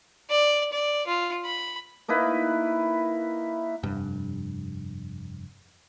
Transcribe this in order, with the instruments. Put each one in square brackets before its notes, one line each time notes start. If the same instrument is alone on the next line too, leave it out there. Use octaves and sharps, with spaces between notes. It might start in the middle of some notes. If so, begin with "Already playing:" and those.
[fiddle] D5
D5
F4
B5
[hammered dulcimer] A#3 D#4 E4 B4
[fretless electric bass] F1 G2